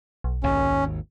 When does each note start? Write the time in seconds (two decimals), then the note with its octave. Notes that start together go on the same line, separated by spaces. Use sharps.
0.24 B1
0.43 G#1 D#2 C#4